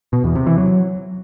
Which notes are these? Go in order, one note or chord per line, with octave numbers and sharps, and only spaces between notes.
B2
E2
C3
E3
F#3